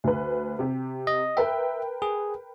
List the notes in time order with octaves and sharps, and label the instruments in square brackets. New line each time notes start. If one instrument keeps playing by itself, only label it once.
[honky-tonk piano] D2 B4
C3 G4
[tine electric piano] D#5
[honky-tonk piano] A#4 B4 G5 [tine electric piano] E5
[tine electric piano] G#4